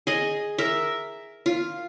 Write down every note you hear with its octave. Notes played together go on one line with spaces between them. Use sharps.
G#4 D#5
A#4 E5
F4